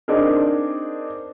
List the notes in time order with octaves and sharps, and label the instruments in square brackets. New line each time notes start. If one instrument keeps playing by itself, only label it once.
[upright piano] C4 D4 D#4 G#4 A#4